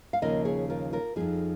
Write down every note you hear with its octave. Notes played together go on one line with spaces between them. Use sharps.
F5
D#2 C#3 F3 A#4 D#5
G#4 C#5
F4 A#4
F4 A#4
F2 F3 D#4 G#4